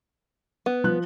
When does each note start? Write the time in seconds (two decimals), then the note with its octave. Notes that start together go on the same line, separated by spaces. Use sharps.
0.66 B3
0.84 F3 F#6